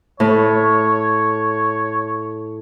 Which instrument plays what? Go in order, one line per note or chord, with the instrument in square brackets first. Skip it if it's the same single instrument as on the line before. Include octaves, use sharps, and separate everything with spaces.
[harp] A2 [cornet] C#5